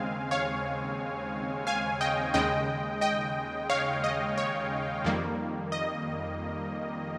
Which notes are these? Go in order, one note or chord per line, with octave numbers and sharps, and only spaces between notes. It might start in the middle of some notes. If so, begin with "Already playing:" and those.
Already playing: D#2 C#3 G#3 C4 F5 G#5
C#5 F5
F5 G#5
D#5 G5
D#2 C#3 G#3 D#5 G5
D#5 G5
C#5 F5
D#5
C#5
F2 D#3 G3 A#3
D#5